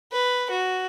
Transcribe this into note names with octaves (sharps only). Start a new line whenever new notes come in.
B4
F#4